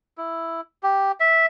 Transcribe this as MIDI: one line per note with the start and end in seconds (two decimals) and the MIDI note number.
0.18 0.61 64
0.83 1.12 67
1.20 1.46 76